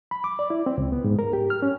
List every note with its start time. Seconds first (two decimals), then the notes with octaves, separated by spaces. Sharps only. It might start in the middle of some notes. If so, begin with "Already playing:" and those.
0.11 B5
0.24 D6
0.39 D5
0.50 E4
0.66 C4
0.78 C#2
0.92 B3
1.04 G#2
1.19 A#4
1.33 G4
1.50 F6
1.62 C#4